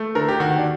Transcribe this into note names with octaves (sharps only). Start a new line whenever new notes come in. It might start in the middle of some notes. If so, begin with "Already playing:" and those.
Already playing: A3
D3 A#4
G4
D#2 F#4
D4